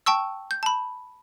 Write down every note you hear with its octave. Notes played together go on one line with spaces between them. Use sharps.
G5 A5 C#6 E6
G6
A5 B5